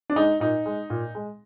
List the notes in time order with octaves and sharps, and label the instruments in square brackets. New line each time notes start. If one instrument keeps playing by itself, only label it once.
[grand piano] D4
G#3 D#4
A#2 D#4
G#3
A#2
G#3